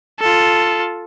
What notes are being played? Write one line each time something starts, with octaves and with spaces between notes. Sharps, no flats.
F4 A4